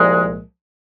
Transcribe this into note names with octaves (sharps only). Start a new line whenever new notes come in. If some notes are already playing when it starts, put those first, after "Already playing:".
Already playing: C2 A#2 F3 G#3